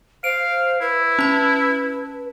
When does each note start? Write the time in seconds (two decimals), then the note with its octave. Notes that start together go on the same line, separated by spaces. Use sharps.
0.24 C5 F5 D7
0.81 E4 B4
1.19 C#4 A5